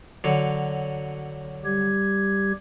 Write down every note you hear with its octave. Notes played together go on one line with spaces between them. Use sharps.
D3 F#3
G3 G4 G#6